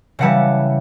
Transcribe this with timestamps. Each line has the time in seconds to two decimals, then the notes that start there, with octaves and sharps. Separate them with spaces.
0.19 C#3 E3 G3 F#5 A5